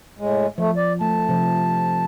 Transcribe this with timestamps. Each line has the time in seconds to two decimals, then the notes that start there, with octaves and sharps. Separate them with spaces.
0.19 A2 G#3
0.58 F3 A3
0.77 D5
1.01 A3 A5
1.28 C3 F3